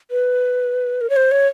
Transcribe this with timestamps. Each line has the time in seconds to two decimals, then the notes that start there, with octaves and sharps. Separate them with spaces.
0.11 B4
1.01 A#4
1.10 C#5
1.16 C5
1.31 C#5